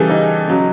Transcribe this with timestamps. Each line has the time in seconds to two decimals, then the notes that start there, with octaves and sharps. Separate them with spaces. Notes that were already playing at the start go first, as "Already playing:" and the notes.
Already playing: C#3 E3 G3 G#4 A4
0.10 D#4
0.47 C#3 F#3